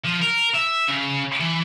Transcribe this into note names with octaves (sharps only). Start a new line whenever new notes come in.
F3
A#4
E5
C#3
E3